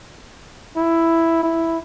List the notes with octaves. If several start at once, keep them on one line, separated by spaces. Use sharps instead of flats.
E4
E4